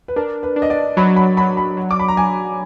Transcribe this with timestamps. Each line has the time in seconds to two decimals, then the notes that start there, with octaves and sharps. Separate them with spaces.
0.08 B4
0.16 D4 A#4
0.43 B4
0.56 D4
0.62 D#5
0.70 D5
0.97 F#3 B5
1.16 B5
1.37 F#3 B5
1.57 B5
1.77 F#3
1.91 D6
1.99 B5
2.08 A#5
2.17 F#3 G#5